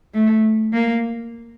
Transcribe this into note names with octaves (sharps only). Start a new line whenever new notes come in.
A3
A#3